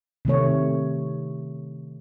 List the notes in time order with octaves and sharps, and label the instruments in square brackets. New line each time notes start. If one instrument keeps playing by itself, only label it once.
[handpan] C3 D#3 A3 C#5